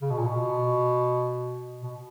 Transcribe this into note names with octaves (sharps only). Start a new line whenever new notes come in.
C#3
B2
A#2
B2
B2